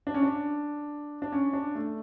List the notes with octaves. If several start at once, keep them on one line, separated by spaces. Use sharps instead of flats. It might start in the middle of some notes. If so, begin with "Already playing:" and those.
D4
C#4
D4
D4
C#4
D4
A3